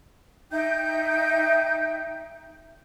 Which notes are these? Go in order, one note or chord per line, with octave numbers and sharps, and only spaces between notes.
D#4 E5 G5 G6